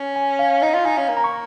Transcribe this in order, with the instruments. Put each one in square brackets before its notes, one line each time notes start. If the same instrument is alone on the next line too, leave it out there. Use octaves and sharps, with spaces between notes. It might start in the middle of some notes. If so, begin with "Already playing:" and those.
Already playing: [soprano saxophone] C#4
[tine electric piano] G#5
F5
[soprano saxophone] D#4 [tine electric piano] D#5
[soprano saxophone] F4 [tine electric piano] F5
[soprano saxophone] D#4 [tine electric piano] G#5
[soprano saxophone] C#4 [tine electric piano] F5
[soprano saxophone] A#3
[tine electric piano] A#5
C#6